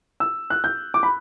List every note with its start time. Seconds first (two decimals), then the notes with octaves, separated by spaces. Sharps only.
0.20 E6
0.50 F#6
0.64 G6
0.94 D6
1.03 B5